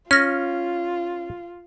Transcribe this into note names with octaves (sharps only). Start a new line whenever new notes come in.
C#4 F4 F6 A#6